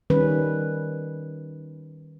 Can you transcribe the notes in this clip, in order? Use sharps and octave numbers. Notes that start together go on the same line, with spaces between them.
D#3 G3 C#4 B4